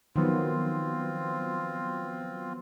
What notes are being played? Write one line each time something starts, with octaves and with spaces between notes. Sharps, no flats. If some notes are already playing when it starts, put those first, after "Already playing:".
D#3 F3 F#3 B3 C4 F4